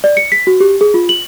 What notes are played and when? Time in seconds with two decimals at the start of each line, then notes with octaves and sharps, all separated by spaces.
0.04 D5
0.17 C#7
0.32 B6
0.47 F#4
0.60 G4
0.81 G#4
0.94 F4
1.09 F#7